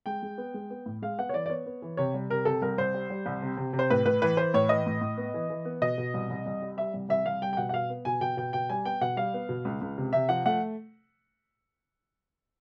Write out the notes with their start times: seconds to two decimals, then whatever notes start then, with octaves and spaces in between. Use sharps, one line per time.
0.06 G#3 G5
0.22 G#3
0.38 B3
0.54 G#3
0.70 B3
0.86 A2
1.02 G#3 F5
1.18 B3 F#5
1.29 C#5
1.33 E3 D5
1.46 D5
1.50 B3 C#5
1.66 B3
1.82 E3
1.97 C3 C#5
2.14 G3
2.30 C3 A#4
2.45 C3 A4
2.62 C2 A#4
2.78 C2 C5
2.94 G3
3.10 G3
3.26 C2
3.42 C3
3.57 C3
3.73 C3
3.79 C5
3.90 A2 B4
4.05 A2 B4
4.22 E3 B4
4.37 E3 C5
4.54 A2 C#5
4.69 E3 D#5
4.86 A2
5.01 A2
5.17 B3
5.34 E3
5.50 E3
5.65 B3
5.82 B2 D#5
5.98 B2
6.14 C2
6.30 C2
6.46 C2
6.62 G3
6.77 G3 E5
6.94 C2
7.09 C2 E5
7.26 C2 F5
7.42 G3 G5
7.53 G5
7.57 B2 F#5
7.69 F#5
7.73 B2 F5
7.90 B3
8.05 B2 G#5
8.21 B2 G5
8.37 B2 G5
8.53 B2 G5
8.69 G3 G#5
8.85 B3 G5
9.01 B2 F#5
9.17 G3 F5
9.34 B3
9.49 B2
9.65 C#2
9.81 C#2
9.98 C3
10.13 C3 E5
10.29 F3 F#5
10.46 A3 F#5